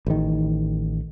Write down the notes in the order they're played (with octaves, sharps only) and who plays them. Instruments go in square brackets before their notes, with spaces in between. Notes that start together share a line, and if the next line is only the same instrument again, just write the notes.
[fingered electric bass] A1 D#3